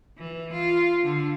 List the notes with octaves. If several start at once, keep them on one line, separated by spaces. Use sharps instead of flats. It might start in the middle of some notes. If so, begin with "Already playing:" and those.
E3
F4
D3